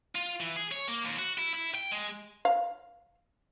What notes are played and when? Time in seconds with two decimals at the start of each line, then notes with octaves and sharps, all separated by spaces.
0.15 F4
0.41 E3
0.56 G#4
0.72 C#5
0.88 A#3
1.05 D#2
1.19 F#4
1.39 E4
1.55 E4
1.75 G5
1.92 G#3
2.45 F5